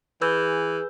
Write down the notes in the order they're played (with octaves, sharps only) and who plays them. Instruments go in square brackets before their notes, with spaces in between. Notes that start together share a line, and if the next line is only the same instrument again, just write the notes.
[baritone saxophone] E3 [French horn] G#4 [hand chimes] B4 E6 G6